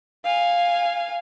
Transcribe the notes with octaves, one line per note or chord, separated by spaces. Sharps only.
F5 G#5